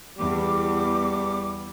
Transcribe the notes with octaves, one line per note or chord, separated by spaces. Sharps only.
E2 G3 D6